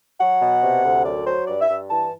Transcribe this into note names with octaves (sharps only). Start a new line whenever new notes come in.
F#3 F#5
B2
C3
D2
F#2 D5
F#3 C5
G2 D5
E5
G2
E3 A5